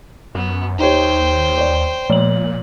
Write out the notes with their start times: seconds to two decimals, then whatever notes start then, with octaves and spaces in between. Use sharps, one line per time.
0.35 F#2 B3
0.79 D#2 D#4 G4 C5 C#5 G5
1.57 C#5 D5
2.10 A#2 F3 A#3 F#7